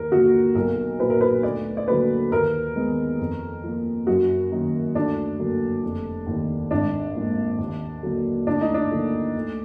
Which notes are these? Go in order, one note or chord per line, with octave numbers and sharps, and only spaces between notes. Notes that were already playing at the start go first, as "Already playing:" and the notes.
Already playing: D#2 A#4
D3 F3 A#3 F#4
B1 A#4
A#2 F#3 B4
A#4
B4
D2 D5
D5
D3 F#3 A#3 B4
D#2 A#4
D#3 G#3 B3
F2
F3 A#3
F#2 F#4
D#3 F#3 A#3 D#4
D2 D4
D3 F#3 A#3
F1
D#2 D#3
G#1 D4
G#2 F3 A#3
D#2
D3 F#3 A#3
D2 D4
D#4
D4
D3 F3 A#3
D2